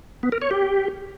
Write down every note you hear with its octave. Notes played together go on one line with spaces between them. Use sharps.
B3
A#4
C#5
G4